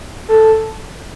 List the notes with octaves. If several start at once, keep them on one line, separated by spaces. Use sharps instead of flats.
A4